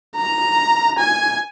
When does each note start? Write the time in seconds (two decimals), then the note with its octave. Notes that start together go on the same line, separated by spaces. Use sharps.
0.16 A#5
0.99 G#5